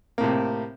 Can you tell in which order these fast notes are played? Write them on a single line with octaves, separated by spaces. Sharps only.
A#3 A2 C3